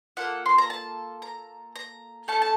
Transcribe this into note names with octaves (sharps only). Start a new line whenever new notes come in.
A#3 F4 A4 F#5
C6
A#5
A5
A#5
A#5
A3 C#4 A4 A5
A5